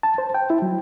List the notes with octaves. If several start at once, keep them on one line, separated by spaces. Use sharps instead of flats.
A5
C5
G5
E4
F#3